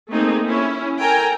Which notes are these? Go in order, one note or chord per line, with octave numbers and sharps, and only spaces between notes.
A3 A#3 C4 D#4 G#4
C#4 E4
A4 A#4 G5 G#5 A#5